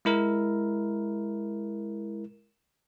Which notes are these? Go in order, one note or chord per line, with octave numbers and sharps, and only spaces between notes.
G#3 E4 A#4